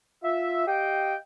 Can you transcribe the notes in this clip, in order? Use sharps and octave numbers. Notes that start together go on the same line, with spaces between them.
F4 E5
G4 D#5 F5 G5